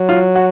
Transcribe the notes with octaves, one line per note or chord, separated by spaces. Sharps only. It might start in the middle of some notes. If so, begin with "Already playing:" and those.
Already playing: F#3
F4
F#4